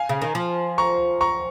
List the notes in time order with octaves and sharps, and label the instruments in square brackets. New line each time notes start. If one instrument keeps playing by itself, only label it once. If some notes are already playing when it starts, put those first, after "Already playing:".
Already playing: [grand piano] F5 G#5
[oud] C#3
D#3
F3
[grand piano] A#5 C#6
A#5 C#6